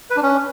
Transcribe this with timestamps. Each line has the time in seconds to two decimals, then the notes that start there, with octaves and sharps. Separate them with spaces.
0.10 B4
0.17 D4
0.23 C#4